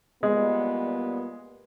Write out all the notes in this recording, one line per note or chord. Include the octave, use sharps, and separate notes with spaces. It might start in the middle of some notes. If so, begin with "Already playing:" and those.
A#2 G3 G#3 B3